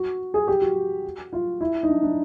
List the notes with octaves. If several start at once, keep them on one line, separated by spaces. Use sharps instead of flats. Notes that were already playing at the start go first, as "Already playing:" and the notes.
Already playing: F#4
G#4
G4
F#4
F4
E4
D#4
D4
D4